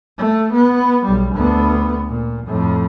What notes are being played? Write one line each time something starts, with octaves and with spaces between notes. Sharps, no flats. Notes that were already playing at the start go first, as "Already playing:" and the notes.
A3
B3
B1 G3
D2 B3
A#2
F2 A2